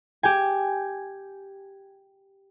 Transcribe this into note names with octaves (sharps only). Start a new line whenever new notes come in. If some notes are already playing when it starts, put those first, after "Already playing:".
G4 G5 G#5